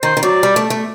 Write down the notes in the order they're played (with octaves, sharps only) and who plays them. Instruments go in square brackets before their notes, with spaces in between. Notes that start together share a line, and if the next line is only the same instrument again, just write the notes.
[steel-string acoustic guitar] D#3 [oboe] C5
[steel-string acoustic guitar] D#3
[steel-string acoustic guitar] F#3 [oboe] D5
[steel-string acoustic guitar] G3
A3
A3